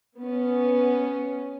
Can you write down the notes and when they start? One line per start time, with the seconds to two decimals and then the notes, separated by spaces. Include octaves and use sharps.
0.17 B3 C#4